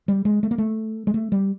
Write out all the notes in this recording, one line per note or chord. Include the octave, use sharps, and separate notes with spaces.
G3
G#3
A3
A#3
A3
G#3
A3
G3